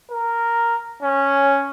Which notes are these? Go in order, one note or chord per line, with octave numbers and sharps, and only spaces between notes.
A#4
C#4